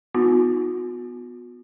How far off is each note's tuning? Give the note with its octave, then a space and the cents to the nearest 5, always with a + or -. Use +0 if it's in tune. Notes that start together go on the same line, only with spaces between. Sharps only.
B3 +0 D#4 +25 F#4 -45